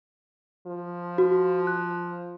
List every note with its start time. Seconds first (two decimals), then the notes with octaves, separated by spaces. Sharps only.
0.67 F3
1.18 F#4
1.67 F#6